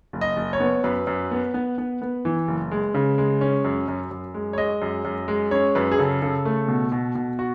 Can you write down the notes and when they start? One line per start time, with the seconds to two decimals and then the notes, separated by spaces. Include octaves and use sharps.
0.13 F#1
0.21 D#5
0.37 F#1
0.53 C#5
0.60 B3
0.84 F#2 B4
1.07 F#2
1.31 B3
1.54 B3
1.78 B3
2.02 B3
2.25 E3
2.48 F#1
2.71 G#3
2.94 C#3
3.18 G#3
3.41 C#4
3.65 F#2
3.88 F#2
4.11 F#2
4.34 G#3
4.53 C#5
4.58 G#3 D#5
4.82 F#2
5.05 F#2
5.28 G#3
5.51 C#4 C#5
5.75 F#2 B4
5.92 G#4
5.98 C#3 A4
6.22 C#3 A4
6.45 A3
6.68 B2
6.92 B2
7.15 B2
7.39 F#4